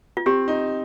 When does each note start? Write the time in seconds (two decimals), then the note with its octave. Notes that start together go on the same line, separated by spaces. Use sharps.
0.17 F4
0.26 C4 G4
0.48 D#4